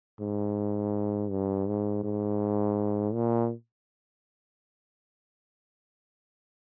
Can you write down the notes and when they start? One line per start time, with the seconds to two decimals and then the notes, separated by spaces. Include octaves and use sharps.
0.20 G#2
1.30 G2
1.67 G#2
2.04 G#2
3.14 A#2